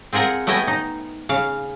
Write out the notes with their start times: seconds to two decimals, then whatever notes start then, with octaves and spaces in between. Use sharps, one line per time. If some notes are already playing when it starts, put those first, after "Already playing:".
0.13 C4 F4 G#4 A#4 F#5
0.47 A3 B3 E4 D#5 G5 G#5
0.68 D#4
1.29 C#3 F5